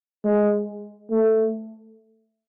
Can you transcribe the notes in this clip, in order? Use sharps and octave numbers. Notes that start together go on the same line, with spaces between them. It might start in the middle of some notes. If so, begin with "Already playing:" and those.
G#3
A3